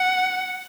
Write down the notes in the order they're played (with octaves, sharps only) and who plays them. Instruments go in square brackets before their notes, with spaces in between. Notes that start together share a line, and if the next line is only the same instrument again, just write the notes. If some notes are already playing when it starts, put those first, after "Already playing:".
Already playing: [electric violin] F#5